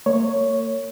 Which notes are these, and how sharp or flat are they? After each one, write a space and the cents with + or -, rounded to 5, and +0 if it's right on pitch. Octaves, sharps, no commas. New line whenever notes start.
A#3 -40 C#5 +0